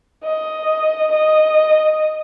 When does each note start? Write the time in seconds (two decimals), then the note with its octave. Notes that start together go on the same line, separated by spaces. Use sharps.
0.24 D#5
1.11 D#5